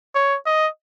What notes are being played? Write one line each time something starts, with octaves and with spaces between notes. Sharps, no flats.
C#5
D#5